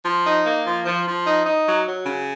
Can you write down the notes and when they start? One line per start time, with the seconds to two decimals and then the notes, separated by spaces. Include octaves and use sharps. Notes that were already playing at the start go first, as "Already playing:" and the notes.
0.04 F3
0.25 D#4
0.45 A#3
0.65 F3
0.84 F3
1.05 F3
1.25 D#4
1.45 D#4
1.66 F#3
1.86 F#3
2.05 C#3